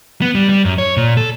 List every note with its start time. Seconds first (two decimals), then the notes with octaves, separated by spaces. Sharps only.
0.22 B3
0.35 G3
0.49 G3
0.64 F#2
0.78 C#5
0.97 A#2
1.17 A4